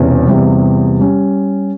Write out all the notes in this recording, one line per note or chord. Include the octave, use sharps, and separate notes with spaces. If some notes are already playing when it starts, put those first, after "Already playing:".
Already playing: E1 E2 C3 C#4
E2 C3 G3
G3 C#4